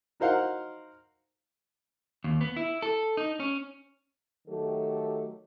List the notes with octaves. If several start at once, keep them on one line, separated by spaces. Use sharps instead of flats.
D#4 F#4 A#4 C5 F5 F#5
D#2
B3
E4
A4
D#4
C#4
D#3 F#3 A3 G4 A4